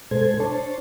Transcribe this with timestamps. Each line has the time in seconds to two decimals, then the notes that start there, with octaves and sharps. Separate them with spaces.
0.11 B2 G#3 A4 C5 G#6
0.40 D4 C5 C#5 A5